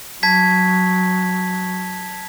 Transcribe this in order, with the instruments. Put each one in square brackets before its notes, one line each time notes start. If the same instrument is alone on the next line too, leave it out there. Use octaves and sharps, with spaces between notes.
[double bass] F#3 [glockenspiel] A5 G#6 B6